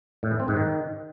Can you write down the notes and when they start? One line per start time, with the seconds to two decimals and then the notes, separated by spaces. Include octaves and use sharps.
0.23 A2
0.31 E3
0.40 C4
0.48 G#2
0.56 D#3